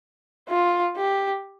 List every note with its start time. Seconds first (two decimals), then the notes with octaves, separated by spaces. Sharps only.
0.49 F4
0.96 G4